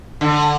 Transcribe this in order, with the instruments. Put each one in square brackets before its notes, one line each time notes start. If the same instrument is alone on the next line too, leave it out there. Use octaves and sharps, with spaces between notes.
[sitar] D3